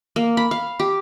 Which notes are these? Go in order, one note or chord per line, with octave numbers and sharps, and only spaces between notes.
A#3
B5
F5
G4